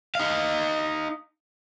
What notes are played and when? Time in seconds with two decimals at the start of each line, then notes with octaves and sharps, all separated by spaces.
0.15 D#4 F5